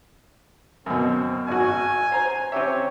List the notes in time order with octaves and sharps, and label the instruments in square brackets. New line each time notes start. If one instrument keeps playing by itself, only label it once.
[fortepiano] F#2 B2 [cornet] C4
[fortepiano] G#1 F#4 [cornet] G#5
[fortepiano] C5 A#5
[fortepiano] C4 G4 E5 [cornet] C#5